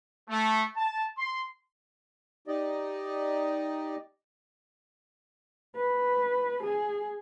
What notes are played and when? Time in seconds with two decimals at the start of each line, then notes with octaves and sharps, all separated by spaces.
0.29 A3
0.76 A5
1.18 C6
2.48 D#4 G4 D5 D#5
5.76 B4
6.63 G#4